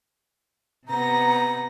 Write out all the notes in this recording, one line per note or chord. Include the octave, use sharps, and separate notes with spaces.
C3 B3 A#5 A#6